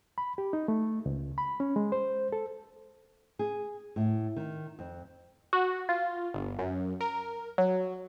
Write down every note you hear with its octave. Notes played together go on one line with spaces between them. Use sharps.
B5
G4
D#4
A3
C#2
B5
C#4
G#3
C5
A4
G#4
A2
D#3
F2
F#4
F4
G1
F#2
A#4
F#3